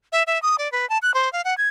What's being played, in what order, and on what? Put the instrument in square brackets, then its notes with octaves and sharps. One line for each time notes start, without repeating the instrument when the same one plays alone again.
[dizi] E5
E5
D#6
D5
B4
A5
F#6
C5
F5
F#5
G#6